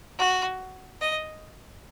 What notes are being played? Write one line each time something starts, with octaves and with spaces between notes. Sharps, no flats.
F#4
D#5